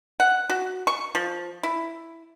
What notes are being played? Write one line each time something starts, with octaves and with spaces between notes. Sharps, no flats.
F#5
F#4
C#6
F3
E4